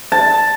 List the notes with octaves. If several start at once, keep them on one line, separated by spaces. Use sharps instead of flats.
A5